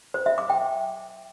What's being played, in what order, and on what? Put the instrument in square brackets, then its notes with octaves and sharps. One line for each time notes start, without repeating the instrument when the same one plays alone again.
[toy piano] C5
E5
D6
G5